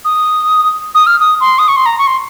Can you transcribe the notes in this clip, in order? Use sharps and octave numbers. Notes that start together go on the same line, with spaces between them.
D#6
D#6
F6
D#6
C6
D#6
C#6
C6
A#5
C#6
C6